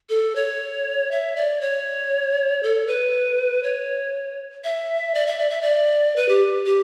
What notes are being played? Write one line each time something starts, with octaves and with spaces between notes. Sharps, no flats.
A4
C#5
E5
D5
C#5
A4
B4
C#5
E5
D5
E5
D5
E5
D5
B4
G4
G4